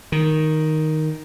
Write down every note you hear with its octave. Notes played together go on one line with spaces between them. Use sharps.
D#3